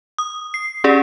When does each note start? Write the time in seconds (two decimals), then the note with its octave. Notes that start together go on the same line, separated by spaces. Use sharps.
0.18 D#6
0.54 C7
0.84 C#4 G4 G#4 D5